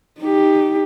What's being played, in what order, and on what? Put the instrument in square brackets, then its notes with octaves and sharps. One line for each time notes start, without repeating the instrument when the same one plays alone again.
[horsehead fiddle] D#4 G4